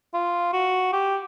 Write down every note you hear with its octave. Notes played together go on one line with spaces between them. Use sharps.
F4
F#4
G4